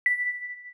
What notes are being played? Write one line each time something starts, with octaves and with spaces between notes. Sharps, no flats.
B6